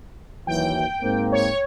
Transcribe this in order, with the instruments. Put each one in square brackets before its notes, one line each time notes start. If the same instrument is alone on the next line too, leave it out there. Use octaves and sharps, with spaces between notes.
[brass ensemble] D#2 E3 F#3 [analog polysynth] G5
[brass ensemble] G#2 A#3 C4
[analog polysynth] C#5